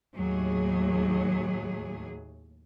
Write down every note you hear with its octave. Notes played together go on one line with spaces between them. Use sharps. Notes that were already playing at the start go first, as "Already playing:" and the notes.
D#2 A2 F#3 G#4